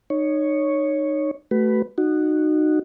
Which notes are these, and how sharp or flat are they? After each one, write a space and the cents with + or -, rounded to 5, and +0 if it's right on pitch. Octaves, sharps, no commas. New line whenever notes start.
D#4 -25 C#5 +0
A3 +0 F#4 +35 B4 +0
D#4 -25 F#4 +0